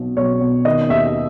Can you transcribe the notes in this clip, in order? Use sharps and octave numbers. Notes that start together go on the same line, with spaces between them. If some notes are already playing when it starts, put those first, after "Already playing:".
Already playing: B1 B2
B1 C#5
B2
D#3 D#5
D#2 E5